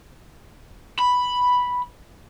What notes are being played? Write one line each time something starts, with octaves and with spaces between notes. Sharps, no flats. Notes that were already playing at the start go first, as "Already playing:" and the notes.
B5